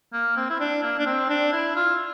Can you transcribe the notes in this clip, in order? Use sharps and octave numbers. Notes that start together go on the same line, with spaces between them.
A#3
C4
E4
D4
A#3
D4
C4
D4
E4
F4